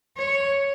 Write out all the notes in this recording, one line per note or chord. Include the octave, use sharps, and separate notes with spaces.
C#5